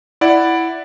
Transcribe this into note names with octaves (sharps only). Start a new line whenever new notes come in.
E4 D5 F#5